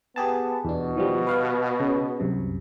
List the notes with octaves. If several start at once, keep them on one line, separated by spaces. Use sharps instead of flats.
B3 G4 G#4 A5
E2 B2 D4
D#3 F3 G3
B4 F5 F#5
C#3
C2 F#2 C3